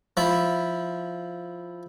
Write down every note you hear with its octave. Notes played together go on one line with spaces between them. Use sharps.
F3 E4 B5